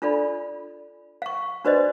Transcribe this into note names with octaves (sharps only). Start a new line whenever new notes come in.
D4 F4 A4 D5 B5
F5 C#6
D4 F#4 B4 C5 D5 D#5